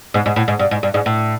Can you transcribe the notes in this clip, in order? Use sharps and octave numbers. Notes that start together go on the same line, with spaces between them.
G#2
G#2
A2
G#2
G2
G#2
G2
G#2
A2